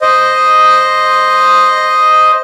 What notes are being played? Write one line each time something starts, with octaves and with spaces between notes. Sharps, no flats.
C5 D#5